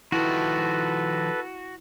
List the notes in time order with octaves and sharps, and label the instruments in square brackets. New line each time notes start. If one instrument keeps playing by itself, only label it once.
[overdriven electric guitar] D#3 F3 [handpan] E4 [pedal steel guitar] F#4 [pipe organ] A4 B4